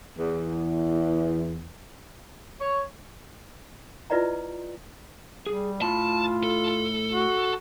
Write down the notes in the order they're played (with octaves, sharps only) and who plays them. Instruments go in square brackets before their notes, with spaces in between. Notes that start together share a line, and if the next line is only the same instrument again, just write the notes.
[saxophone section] E2
C#5
[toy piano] E4 F4 B4 D5 D#5 A#5
[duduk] G3 [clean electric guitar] G#4
[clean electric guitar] A2 B5 [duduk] F4 [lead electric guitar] A5
[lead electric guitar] A4
[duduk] F#4